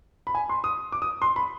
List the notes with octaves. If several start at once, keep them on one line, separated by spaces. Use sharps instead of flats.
B5
G#5
C6
D#6
D6
D#6
C6
B5